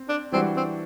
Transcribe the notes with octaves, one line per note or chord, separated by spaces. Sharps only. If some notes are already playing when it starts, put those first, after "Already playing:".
Already playing: C4
D4
E3 G3 C4 D4 F#4
C4